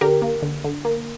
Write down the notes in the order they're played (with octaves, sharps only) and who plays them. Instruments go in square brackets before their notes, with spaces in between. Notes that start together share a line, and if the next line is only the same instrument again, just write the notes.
[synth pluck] D3 G4 A#4
A#3
D3
D3
A#3